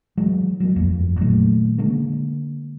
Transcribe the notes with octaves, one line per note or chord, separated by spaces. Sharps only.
E3 F#3 G#3
F#3 A#3
G1 F2
A#2 D#3 F#3 A3
D3 G#3 A#3